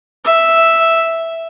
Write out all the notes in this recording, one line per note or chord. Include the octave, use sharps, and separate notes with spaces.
E5